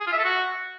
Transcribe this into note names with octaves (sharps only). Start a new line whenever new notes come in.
G#4
F4
E5
A4
F#4